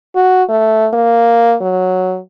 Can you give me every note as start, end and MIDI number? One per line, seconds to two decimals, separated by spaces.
0.16 0.43 66
0.49 0.88 57
0.94 1.55 58
1.61 2.19 54